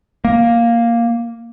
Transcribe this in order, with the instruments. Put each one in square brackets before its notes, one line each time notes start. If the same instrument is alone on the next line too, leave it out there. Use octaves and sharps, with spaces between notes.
[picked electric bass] A#3